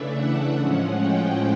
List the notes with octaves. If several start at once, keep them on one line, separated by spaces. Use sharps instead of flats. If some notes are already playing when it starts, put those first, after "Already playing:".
Already playing: C#3 E3 A3 D4 E5
F#5
A2 F3 G#3 C#4 F#5
G5